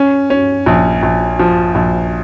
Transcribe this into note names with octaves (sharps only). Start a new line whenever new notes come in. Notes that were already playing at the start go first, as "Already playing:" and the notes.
Already playing: C#4
C#4
A#1
A#1
F3
A#1